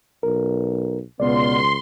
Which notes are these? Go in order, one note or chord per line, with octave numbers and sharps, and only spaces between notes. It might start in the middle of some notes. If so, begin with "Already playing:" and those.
B1 A#4
C#2 B2 B3 F4 D5 C6